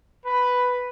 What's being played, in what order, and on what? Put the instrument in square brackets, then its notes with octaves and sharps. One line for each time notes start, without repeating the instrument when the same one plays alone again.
[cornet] B4